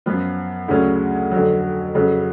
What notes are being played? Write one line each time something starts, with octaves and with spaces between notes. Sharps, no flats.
F#2 F3 B3 F4
D2 C#3 F#3 C#4
F2 D3 F#3
F2 C#3 F#3